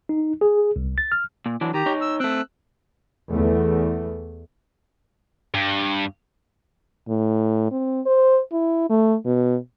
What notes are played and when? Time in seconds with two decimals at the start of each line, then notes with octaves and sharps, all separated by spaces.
0.09 D#4
0.41 G#4
0.76 C2
0.98 A6
1.12 F6
1.46 A#2
1.61 E3 F#3 D4
1.74 D#3 G4 A#5
1.86 D#4 C#5
2.01 E6
2.20 A3 C4 E6 F#6
3.31 E2 A3
5.54 G2
7.08 A2
7.71 C4
8.06 C5
8.52 E4
8.90 A3
9.25 B2